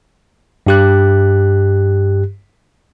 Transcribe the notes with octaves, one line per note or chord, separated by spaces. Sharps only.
G2 G4 F#6